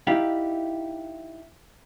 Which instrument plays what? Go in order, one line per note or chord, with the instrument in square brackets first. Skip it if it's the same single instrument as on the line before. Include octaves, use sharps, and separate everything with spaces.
[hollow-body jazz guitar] D#4 E4 G4 F5